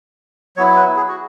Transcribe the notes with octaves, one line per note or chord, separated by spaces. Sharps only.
F#3 B3 E4 C#5
B4
G#4
F#4